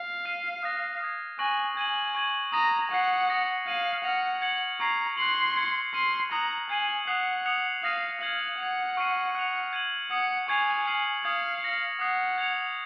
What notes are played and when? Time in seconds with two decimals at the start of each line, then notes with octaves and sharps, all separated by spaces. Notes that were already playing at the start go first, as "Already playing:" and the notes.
Already playing: F5
0.25 F6 C7 D#7
0.63 D#6 F#6 A#6
1.01 D#6 G#6 C7
1.39 G#5 C#6 F#6 A#6 D#7 F#7
1.76 G#5 G#6 D#7 F#7
2.15 C#6 G#6 D#7 F#7
2.52 A#5 D#6 A#6 D#7
2.91 F#5 C#6 F#6 C7
3.29 D#6 A#6 C#7 F#7
3.67 F5 G#6 D#7 F#7
4.04 F#5 F6 A#6 F7
4.42 G#6 C#7 F#7
4.80 A#5 C#6 G#6 C7 F7
5.17 C6 F#6 C7 F#7
5.56 G#6 C#7 F#7
5.94 C6 F6 C7 D#7 F#7
6.31 A#5 D#6 F#6 C#7 F#7
6.69 G#5 G#6 C7 D#7 F#7
7.07 F#5 D#6 F#6 C7 F7
7.45 D#6 F#6 C#7 F7
7.83 F5 D#6 A#6 D#7
8.21 F5 F6 G#6 D#7 F#7
8.59 F#5 G#6 C#7 F7
8.97 C#6 F6 C7 D#7
9.35 F#6 C#7 F7
9.73 G#6 D#7 F#7
10.11 F#5 D#6 G#6 C#7
10.48 G#5 C#6 G#6 C7 F7
10.86 F6 C7 D#7 F#7
11.24 F5 D#6 G#6 C#7
11.62 F6 A#6 C#7 F#7
12.00 F#5 D#6 F#6 C7
12.38 G#6 C#7 F7